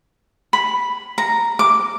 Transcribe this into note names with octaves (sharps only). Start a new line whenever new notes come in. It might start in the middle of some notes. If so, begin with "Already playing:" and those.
B5
A#5
D6